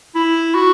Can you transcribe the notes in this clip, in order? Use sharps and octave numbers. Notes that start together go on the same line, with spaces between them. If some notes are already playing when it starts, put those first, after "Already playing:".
E4
F#4